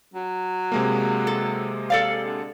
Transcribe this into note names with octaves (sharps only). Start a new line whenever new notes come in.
F#3
C3 G#3 A#3
A4
A4 D5 F5
D3